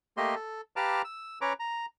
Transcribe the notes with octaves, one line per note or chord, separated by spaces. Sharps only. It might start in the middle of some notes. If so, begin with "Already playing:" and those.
A3 A#3 G4 D#5 C6
A4
G4 B4 F5 A5 A#5 D6
E6
C#4 B4 C#5 A#5 D6
A#5